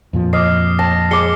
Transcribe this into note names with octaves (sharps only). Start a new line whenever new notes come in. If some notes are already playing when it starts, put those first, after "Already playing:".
F2 A#2 F3
D#5 D6 F6 C7
A5 A#6
G#3 D6 C7 C#7 G7